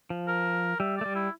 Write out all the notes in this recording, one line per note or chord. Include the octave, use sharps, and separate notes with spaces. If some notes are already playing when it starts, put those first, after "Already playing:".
F3
A#4
G3 E5
A3 D5
G3
E4